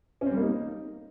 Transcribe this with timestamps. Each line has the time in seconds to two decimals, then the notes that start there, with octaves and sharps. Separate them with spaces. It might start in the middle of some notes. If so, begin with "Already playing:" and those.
0.21 C#4
0.26 C4
0.31 G3
0.36 A#3
0.41 D#4